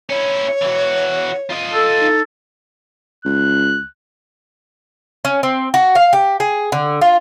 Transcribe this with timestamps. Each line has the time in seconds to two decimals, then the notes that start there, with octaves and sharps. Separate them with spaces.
0.10 C#4 E4 C#5
0.62 E3 F#4
1.50 F4 D#5
1.73 A4
2.00 D#4
3.25 C#2 F#6
5.25 C#4
5.43 C4
5.74 F#4
5.95 F5
6.13 G4
6.40 G#4
6.72 D3
7.01 F4